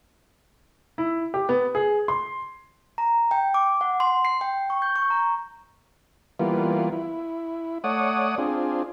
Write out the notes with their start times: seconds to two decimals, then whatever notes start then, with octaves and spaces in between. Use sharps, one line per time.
0.98 E4
1.34 G4
1.49 B3
1.75 G#4
2.08 C6
2.98 A#5
3.31 G5
3.54 D6
3.81 F#5
4.00 C6
4.25 C7
4.41 G5
4.70 C#6
4.82 G6
4.96 C#6
5.10 A#5
6.40 E3 G3 A#3 B3 F4
6.92 E4
7.84 A3 C#5 D5 F#5 D#6
8.38 C4 D4 F4 G#4